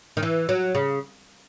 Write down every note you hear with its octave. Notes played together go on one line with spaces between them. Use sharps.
D#3
E3
F#3
C#3